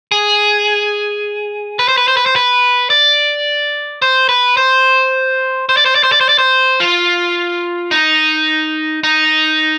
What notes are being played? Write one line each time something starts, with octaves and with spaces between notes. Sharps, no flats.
G#4
B4
C5
B4
C5
B4
C5
B4
D5
C5
B4
C5
C5
D5
C5
D5
C5
D5
C5
D5
C5
F4
D#4
D#4